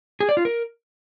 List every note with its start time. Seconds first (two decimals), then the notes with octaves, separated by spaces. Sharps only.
0.20 G#4
0.29 D5
0.37 F4
0.45 A#4